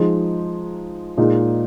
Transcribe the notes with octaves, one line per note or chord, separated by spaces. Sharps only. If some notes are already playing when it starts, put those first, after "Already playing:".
Already playing: F3 G#3 D#4
A#2 G#3 D#4